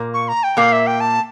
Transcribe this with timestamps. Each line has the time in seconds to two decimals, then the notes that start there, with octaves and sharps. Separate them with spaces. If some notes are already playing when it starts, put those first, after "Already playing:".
Already playing: A#2 A#3
0.14 C#6
0.28 A#5
0.43 G5
0.57 A#2 A#3 F5
0.72 E5
0.87 G5
1.01 A5